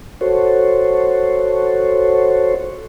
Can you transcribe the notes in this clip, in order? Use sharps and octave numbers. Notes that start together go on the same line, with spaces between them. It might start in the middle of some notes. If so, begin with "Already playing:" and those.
F#4 A4 C5 C#5